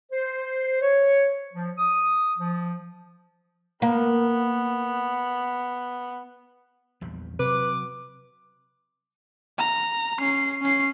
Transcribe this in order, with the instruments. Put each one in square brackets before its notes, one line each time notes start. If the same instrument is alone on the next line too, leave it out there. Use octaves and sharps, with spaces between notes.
[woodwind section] C5
C#5
F3
D#6
F3
[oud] A#3 [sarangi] B3
[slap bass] A#1 E2 G3
[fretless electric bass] C3 [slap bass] F#3 [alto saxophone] B4 [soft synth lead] D6
[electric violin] A#5
C#4 C7
C#4 C7